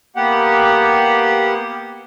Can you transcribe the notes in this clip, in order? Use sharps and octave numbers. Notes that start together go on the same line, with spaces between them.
A#3 B3 G4 F#5